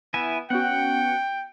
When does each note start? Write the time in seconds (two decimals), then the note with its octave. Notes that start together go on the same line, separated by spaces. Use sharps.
0.14 B3 E4 E5 G#5
0.50 B3 C#4 F#4 F#5 G5